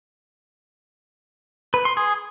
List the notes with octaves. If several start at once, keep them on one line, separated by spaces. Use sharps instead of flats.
B4
C6
G#4